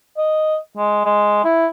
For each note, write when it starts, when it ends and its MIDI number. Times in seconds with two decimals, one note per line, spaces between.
0.17 0.58 75
0.77 1.05 56
1.05 1.40 56
1.45 1.67 64